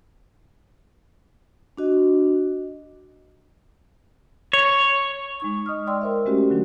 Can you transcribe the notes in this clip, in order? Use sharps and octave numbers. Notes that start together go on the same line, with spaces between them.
D4 F#4 D#5
C#5
G#3 D#4 C#6
D#5 D#6 F6
D5 G5 C6 E6
A#4 C5 E5
G#3 A3 C#4 F#4 G4
D3 F#3 D4